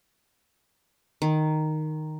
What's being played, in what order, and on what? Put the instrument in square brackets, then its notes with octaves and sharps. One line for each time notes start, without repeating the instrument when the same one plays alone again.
[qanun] D#3